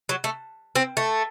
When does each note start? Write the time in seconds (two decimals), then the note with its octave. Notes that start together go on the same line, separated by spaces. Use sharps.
0.09 F#3
0.24 A3
0.76 C4
0.97 A3